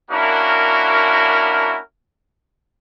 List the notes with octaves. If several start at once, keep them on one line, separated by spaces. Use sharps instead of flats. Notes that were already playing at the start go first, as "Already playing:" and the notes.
A#3 C#4 D4 E4 F#4 A#4